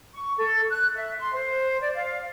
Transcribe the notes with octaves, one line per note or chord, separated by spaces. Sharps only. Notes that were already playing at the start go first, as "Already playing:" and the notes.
C#6
A4
F#6
E5
C6
C5
D5
F5